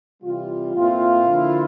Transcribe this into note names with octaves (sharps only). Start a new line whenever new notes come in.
C3 E3 G3 F4
A#2 A3 C4 E4 F4
D3 F3 A#3 E4